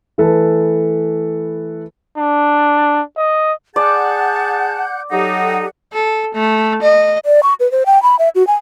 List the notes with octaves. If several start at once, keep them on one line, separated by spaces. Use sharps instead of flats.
E3 A3 A4 B4
D4
D#5
G#4 D5 F#5 A5 F#6 G6
F#3 D#4 G4 A4 F#5
A4
A3
D#5
D5
C#6
B4
C5
G5
B5
E5
F#4
G#5